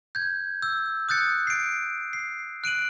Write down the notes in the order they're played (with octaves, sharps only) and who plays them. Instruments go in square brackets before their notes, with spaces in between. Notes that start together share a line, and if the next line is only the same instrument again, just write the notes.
[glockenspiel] G6 G#6
E6 G6
D#6 F#6 G6 A6 C#7
C7 D7
C7
F#6 D7 D#7 F#7